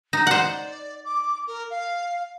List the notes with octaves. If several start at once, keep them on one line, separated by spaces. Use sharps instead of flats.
D#4
C5 D5 F#5
D6
A#4
F5